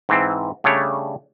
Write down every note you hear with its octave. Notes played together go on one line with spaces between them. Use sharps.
G#2 E3 C4
C#3 G3 A3 D4 C#5